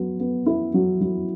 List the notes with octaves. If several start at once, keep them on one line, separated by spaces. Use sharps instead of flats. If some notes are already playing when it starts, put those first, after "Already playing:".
Already playing: F#3 B3
B3
E4
F#3
F#3